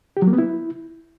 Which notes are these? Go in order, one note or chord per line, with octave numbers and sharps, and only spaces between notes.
G4
F#3
A#3
B3
E4